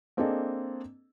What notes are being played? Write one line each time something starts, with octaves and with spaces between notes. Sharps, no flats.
A#3 C4 D4 G#4 A4 D#5